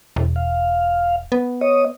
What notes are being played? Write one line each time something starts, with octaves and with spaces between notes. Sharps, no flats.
E1
F5
B3
C#5 D#5 D#6